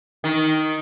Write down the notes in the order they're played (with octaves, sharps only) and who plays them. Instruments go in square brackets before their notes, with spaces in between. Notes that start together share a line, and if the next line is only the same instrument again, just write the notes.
[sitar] D#3